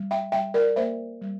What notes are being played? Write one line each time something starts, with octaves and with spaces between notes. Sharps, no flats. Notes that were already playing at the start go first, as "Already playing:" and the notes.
Already playing: G3
E5 G5
G3 E5 G5
A#4 D5
A#3 C5 E5
G3